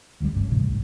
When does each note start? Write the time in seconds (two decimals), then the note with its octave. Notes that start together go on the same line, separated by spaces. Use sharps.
0.20 F1 D2 C3 G3
0.35 G1 C#2 G2
0.51 D2 A2 C3 E3
0.68 B1 G#2